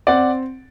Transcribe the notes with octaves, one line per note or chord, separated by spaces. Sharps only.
C4 D5 F#5